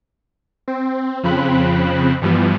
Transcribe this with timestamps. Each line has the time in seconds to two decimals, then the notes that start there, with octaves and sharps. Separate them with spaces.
0.68 C4
1.23 F2 C#3 F3 C4 B5 F#6
2.21 G2 E3 F3 G3 B3